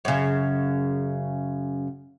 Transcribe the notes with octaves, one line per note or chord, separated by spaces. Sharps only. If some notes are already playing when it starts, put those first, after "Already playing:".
F#2 C#3